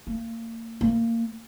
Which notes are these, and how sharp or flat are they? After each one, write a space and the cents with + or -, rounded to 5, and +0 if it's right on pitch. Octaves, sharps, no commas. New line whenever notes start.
A#3 -35
A#3 -20